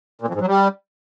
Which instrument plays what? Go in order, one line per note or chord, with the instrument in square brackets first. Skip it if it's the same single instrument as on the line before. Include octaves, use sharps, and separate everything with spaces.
[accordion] A#2
F2
G#2
F#3
G3